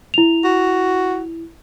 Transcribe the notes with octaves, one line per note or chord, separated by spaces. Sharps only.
E4 F7
F#4